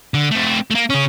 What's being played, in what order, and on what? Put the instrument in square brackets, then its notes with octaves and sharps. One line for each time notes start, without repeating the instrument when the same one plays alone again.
[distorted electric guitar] D3
A3 C4
A3 A#3
C#3 C#4